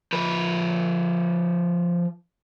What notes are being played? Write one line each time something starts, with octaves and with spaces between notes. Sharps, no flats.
F3 B4